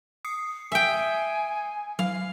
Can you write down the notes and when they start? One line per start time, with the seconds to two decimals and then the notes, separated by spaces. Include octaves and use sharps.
0.25 D#6 C7 C#7
0.72 E5 G5 G#5
1.99 F#3 F5